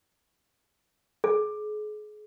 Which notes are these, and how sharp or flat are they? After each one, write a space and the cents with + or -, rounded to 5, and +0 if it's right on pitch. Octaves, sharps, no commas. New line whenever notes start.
G#4 +35